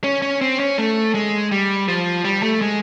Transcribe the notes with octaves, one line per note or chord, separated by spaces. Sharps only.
C#4
C#4
C4
C#4
A3
G#3
G3
F3
G3
A3
G#3